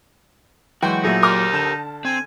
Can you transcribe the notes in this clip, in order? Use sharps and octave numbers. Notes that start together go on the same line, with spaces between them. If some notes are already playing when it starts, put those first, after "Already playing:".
E3 F#3 G#3 F#4 G5 C6 G6
A#2 F#3 A3 D#4 E4 G#4
G4 A#4 C6 D6 F6
D3 A5 G6 E7
C4 G#5